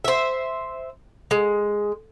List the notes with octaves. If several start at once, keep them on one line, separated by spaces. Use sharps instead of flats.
C5 E5
G#3